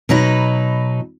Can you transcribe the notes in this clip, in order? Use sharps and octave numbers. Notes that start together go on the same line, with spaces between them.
B2 F#3 D#4 B4